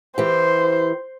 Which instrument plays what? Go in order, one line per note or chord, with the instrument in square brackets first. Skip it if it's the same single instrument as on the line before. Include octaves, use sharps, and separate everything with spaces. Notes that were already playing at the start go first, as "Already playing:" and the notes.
[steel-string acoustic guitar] E3 G4 [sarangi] C5